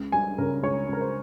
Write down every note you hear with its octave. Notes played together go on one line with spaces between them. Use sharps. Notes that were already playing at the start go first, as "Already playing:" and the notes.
Already playing: C#2
G3 G#5
C#3 A#4
C#2 C#5
C#2 A#4
C5